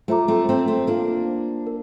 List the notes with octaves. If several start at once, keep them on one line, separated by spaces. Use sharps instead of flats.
A3 F4 C5 E5 A#5 D6
A3 C4
A3 C4
A3 C4
A#3 D4 F4 C5 F5
A#4